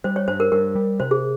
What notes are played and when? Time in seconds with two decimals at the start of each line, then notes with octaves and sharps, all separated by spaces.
0.04 G3 C5
0.16 C#5
0.28 G2 C5
0.40 A#4
0.52 G2 A#4
0.75 G3
1.00 C3 C5
1.11 G#4